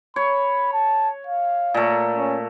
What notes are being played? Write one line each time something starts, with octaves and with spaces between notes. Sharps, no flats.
C#5 B5
A5
F5
A#2 A3
C#4